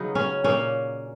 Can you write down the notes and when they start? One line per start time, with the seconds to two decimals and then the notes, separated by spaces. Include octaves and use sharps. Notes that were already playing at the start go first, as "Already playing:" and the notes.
Already playing: C#3 F#3 B3 D#4
0.15 C#4
0.44 A#2 A#3 C#4